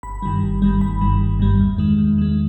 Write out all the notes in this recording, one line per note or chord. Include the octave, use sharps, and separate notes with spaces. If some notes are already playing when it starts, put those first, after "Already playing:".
G1 B5
G2 D#3 G3
G1
G2 D#3 G3
G1 B5
G2 D#3 G3
G1
G2 D#3 G3
E2
D#3 G#3
E2
D#3 G#3